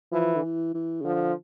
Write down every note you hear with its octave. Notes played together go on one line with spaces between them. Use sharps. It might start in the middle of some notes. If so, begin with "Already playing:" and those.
E3 F3
D3
E3
E3
C#3
D3 F3